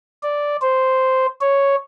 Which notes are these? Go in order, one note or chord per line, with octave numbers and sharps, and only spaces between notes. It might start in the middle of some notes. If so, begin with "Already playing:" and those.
D5
C5
C#5